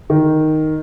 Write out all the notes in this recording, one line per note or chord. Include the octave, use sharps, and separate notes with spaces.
D#3